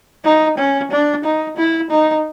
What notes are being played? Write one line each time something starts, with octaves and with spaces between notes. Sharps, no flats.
D#4
C#4
D4
D#4
E4
D#4